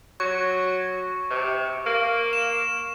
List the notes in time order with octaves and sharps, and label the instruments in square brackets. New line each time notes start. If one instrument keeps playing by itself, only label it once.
[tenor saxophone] F#3 [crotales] C#6
[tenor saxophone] C3
A#3
[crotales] E7